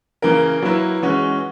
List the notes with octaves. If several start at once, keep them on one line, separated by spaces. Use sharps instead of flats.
C#3 E3 A#3 A#4
F#3 A#3 E4 B4
E3 G#3 C#4 F#4